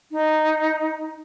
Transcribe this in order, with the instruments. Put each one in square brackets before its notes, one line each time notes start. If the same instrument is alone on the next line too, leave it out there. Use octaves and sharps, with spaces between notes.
[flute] D#4